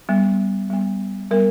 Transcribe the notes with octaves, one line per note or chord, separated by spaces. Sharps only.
G3 B3
G3 B3
G3 B3 A#4